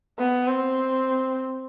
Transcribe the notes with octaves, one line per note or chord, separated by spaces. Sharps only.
B3
C4